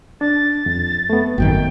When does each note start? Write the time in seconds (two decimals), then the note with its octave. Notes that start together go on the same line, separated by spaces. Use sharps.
0.21 D4 A6
0.66 F2
1.10 A3 B3
1.38 G#1 F#2 D#3 G5